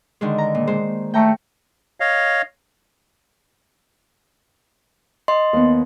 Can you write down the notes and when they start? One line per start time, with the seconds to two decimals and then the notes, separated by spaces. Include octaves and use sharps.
0.21 D3 D#3 G#3
0.38 A#5
0.55 A#2
0.67 G#3 C5
1.14 A3 G5 A#5 C#6
2.00 C#5 D#5 F5
5.28 D#5 C6
5.53 D#2 B3